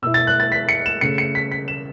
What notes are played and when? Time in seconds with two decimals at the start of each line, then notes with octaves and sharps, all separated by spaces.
0.02 B2 B3 E4 E6
0.14 A6
0.27 F#6
0.40 A6
0.52 B6
0.69 C#7
0.86 E7
1.01 C#3 A3 C#4 C#7
1.18 C#7
1.35 B6
1.52 B6
1.68 E7